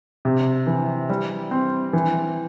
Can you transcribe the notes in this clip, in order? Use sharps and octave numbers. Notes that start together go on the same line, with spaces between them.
C3
E3
G3
C4
E3